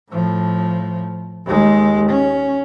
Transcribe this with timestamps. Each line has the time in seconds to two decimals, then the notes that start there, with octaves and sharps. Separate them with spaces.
0.10 A2 F3
1.46 D#2 G#3
2.10 C#4